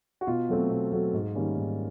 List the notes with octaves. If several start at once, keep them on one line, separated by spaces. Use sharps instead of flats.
F#4
B2 F4
F#3 A3 C4
B2
F#3 A3 C4
G#2
D#3 G3 A#3 C#4
G#2